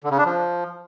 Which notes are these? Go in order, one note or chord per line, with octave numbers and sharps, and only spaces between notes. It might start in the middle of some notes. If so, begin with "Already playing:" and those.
D3
C#3
D4
F3